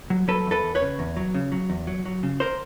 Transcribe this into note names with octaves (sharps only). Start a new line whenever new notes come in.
F#3
F#3 A4 B4
E2
A4 B4
E2
B4 C#5
C#3
E2
F#3
C#3
F#3
E2
F#3
F#3
C#3
A#4 C5